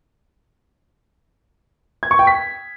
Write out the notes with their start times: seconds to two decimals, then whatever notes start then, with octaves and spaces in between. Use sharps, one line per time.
2.03 G#6
2.11 C#6
2.19 G5
2.27 B6